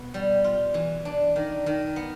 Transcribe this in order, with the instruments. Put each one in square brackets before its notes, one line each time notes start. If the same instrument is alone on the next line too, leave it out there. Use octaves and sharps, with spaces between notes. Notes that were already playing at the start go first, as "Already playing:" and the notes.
Already playing: [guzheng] B2 B3
G3
F4
E3
D4
D#3
D#3
B3